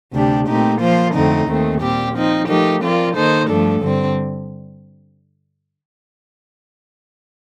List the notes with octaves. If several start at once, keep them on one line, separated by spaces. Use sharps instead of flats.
D2 C3 G3 D4 G4
A#2 A3 C4 D#4 G4
F3 A#3 F4 C5
F2 D3 A3 C4 D#4
D#2 D#3 A3 C4
A#2 G3 C4 G4
F3 C4 D#4
F3 A3 D#4 G4 A#4
F3 C4 F4 A#4 D5
D#3 A#3 D#4 A4 C5
G2 F3 A3 D4 A4
G2 D3 G3 C4